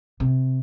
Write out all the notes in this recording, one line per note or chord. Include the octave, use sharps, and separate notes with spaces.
C3